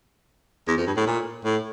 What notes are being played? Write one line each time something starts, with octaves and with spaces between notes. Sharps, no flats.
E2
F2
G2
A2
A#2
A2